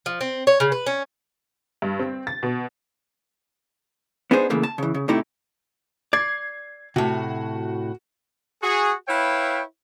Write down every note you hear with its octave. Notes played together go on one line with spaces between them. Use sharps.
F3
C4
C#5
C#3
B4
C#4
G2
C4
A6
B2
B3 D4 D#4 G#4 A4 C5
C#3 E3 A3 A#3
A5
C#3 E3
C#3
A2 C3 A3 D#4 E4 G4
D5 G#6 C7
A2 C3 F#4
F#4 G#4
E4 B4 C#5 E5 F5 G5